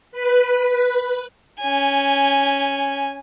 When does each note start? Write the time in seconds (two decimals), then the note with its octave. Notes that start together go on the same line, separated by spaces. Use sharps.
0.12 B4
1.60 C#4 G#5